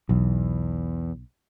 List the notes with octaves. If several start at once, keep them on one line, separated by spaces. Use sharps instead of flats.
B1 E2